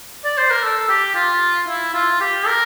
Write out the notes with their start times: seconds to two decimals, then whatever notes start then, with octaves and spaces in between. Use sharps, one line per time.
0.24 D5
0.38 C5
0.51 A#4
0.64 A4
0.89 G4
1.15 F4
1.68 E4
1.94 F4
2.21 G4
2.47 A#4